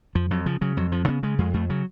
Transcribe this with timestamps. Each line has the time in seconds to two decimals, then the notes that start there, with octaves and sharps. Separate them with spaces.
0.15 F2 F3
0.31 F2 F#3
0.46 C#3 F3
0.61 C#3 F#3
0.77 F2 F#3
0.92 F2 F3
1.08 C#3 B3
1.23 C#3 G#3
1.39 F2 G#3
1.54 F2 A3
1.69 C#3 F#3